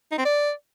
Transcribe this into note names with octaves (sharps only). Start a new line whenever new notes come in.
D#4
C4
D5